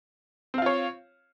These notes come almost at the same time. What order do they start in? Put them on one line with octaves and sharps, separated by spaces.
C4 F5 F4 C#5